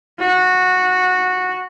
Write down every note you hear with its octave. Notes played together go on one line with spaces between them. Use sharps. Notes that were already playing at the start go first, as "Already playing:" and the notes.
F#4